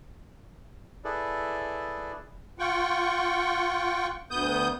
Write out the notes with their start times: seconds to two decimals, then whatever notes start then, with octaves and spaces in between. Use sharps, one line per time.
1.05 E4 G#4 A4 B4 D5
2.59 F4 F#5 G5 C#6
4.31 D2 B3 D#6 G6